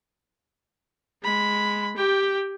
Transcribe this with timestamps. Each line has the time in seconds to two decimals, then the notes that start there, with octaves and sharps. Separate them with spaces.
1.23 G#3 B5
1.97 G4 G5